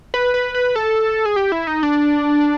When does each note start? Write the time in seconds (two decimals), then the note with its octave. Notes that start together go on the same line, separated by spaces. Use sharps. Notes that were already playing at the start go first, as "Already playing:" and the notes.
0.14 B4
0.34 B4
0.55 B4
0.76 A4
1.25 G#4
1.36 G4
1.52 E4
1.67 D#4
1.83 D4